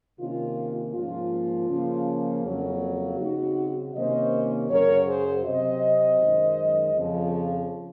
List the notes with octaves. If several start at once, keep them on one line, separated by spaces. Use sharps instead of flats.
C3 D#3 A#3 C#4 F4
G#2 F3 A#3 C#4 F4
C#3 F3 A#3 C#4
F2 C#3 F#3 A#3
C#3 F#3 C4 D#4 F#4
C3 D#3 A#3 C#4 C5 D#5
F#2 C#3 F#3 A#4 C#5
G#4 C5
C3 F#3 C4 C5 D#5
F#2 D#3 G#3
F2 C#3 F3